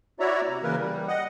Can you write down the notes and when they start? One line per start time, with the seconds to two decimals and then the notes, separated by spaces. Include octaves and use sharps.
0.20 E4 F#4 C#5 D5 E5 A#5
0.48 C3
0.63 C#3 E3 A#3 A#4 B4
0.79 G3
1.08 D#5 F#5